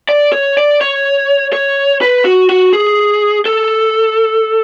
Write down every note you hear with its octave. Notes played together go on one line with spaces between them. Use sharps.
D5
C#5
D5
C#5
C#5
B4
F#4
F#4
G#4
A4